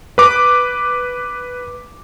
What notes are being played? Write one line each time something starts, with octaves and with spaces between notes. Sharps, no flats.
B4 D6